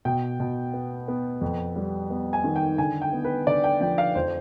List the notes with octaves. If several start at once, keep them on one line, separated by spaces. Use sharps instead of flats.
B2 G5
B2
B3
B3
F2
G3
B3
G#5
D#3
G5
D3 G#5
G5
B3
B4
D3 D5
G5
F3 G5
F5
F2 C5